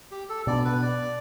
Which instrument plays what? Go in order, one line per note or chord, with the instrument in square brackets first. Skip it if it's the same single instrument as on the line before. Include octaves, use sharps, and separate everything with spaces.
[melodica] G4
A4
[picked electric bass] B2 B3 D4 [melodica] D5
[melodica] B4
D5